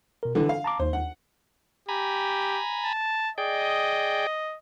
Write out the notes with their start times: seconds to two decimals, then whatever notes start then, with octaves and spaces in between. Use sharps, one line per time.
0.23 B2 A#4
0.35 D3 E3 A4
0.49 F5
0.64 A5 A#5 D6
0.80 D#2 D#4 C5
0.93 F#5
1.89 G4 G#5 A#5 B5
2.85 A5
3.38 G#4 D5 D#5 G5